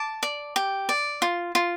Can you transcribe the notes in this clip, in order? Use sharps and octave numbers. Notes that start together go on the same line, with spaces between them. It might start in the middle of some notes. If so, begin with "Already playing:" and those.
Already playing: A5 D6
D5
G4
D5
F4
F4